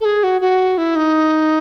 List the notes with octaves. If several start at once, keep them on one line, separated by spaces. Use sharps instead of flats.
A4
G#4
F#4
F#4
E4
D#4